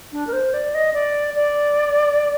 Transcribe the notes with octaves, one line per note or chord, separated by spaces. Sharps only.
D4
A#4
C5
D5
D#5
D5
D5